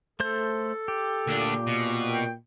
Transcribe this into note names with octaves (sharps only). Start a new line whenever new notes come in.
A3 A4 C5 G6
G4
D2 A#2 D4
B2
G5